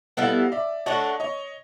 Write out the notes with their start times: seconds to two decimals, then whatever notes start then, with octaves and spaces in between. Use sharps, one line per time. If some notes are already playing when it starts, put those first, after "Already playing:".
0.17 G3 B3 E4 A4 D#5 F5
0.52 D5 E5
0.86 A3 D4 F#4 C#5 D#5
1.20 C#5 D#5